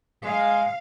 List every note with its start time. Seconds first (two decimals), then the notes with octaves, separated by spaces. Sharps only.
0.24 G#3 F5